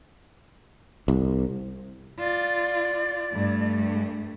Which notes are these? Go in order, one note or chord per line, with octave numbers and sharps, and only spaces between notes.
C2
F4 D5
G2 A3